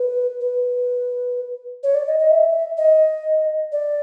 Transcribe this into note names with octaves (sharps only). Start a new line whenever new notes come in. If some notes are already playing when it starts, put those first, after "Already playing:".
Already playing: B4
B4
C#5
D5
D#5
D#5
E5
D#5
D5